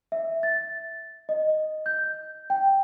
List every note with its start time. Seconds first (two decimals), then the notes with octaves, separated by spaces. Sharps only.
0.12 E5
0.43 A6
1.29 D#5
1.86 G6
2.50 G5